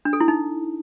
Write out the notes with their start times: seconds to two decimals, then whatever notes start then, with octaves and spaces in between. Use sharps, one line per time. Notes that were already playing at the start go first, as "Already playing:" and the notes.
0.05 D4
0.13 A4
0.21 E4
0.28 D#4